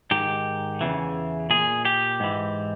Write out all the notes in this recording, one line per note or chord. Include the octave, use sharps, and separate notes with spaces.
G#2 D#3 G4
E2 C#3 E3
A#2 G#4
G4
G#2 E3